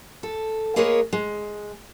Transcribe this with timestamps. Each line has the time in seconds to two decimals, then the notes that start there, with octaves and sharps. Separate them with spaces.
0.23 A4
0.76 G#3 A#3 G#4 A#4 B4 C#5
1.13 G#3